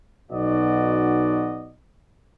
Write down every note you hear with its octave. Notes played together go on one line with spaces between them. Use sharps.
B1 B2 D#4 F#4 D5 D#5